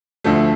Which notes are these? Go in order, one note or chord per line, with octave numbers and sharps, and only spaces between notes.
D2 D3 F3 A3